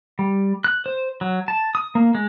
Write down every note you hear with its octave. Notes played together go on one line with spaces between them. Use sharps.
G3
F#6
C5
F#3
A5
D#6
A#3
G#3